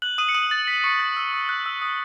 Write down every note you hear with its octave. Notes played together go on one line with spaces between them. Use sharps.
F#6 F#7
D#6 D#7
C#7
D#6 D#7
A6
B6
C#6 C#7
A6
E6
D#6
F#6
E6
D#6